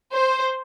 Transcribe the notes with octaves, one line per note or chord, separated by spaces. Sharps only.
C5